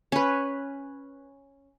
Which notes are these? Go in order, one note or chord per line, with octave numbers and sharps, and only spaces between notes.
C#4 B4